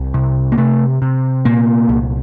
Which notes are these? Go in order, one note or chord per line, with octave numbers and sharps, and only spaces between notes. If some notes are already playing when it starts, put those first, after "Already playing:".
Already playing: C2
C3
A#3
C3 A3
C3
A#2 A#3
C2